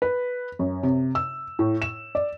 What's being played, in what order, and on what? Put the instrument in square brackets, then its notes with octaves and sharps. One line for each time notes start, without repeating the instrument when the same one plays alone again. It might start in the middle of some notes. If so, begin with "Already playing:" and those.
[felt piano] B4
F#2
C3
E6
A2
E7
D5